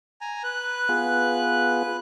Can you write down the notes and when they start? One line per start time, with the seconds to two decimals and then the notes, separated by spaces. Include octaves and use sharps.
0.21 G#5 A#5
0.44 B4 F#6
0.89 B3 F4 G#4